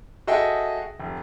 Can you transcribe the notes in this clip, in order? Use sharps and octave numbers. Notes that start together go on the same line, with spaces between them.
F#4 G#4 A4 D#5 E5 G5
F1